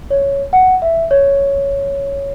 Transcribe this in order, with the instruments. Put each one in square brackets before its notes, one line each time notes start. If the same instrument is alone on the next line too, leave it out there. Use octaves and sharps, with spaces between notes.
[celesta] C#5
F#5
E5
C#5